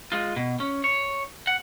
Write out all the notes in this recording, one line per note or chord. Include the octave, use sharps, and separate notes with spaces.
G#3 F4
B2
C#4
C#5
F#5